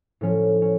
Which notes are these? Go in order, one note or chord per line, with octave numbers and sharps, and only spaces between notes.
A2 F3 C#4
C#4